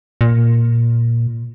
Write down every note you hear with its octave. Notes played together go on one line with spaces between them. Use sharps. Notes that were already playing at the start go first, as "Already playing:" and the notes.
A#2